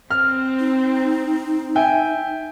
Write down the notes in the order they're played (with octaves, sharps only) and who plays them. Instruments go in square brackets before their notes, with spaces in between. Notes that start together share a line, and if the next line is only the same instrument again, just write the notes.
[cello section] C4 [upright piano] F6
[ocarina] D#4
[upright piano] E5 G5 G#5